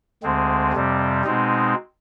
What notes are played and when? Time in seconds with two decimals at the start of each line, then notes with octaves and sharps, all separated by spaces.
0.23 D2 D3 G#3 C4
0.73 F2 C3 G3 C4
1.23 B2 G#3 C4 D#4